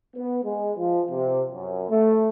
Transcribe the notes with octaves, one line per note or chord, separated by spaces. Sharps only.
B3
G#3
F3
C3
F#2
A3